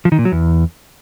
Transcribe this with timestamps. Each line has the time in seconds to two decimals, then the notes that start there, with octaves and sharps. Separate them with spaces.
0.05 F3
0.12 D#3
0.19 A#2
0.25 F#3
0.32 E2